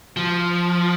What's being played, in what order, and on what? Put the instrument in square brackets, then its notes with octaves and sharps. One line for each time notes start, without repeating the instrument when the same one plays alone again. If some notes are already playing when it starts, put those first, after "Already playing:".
[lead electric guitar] F3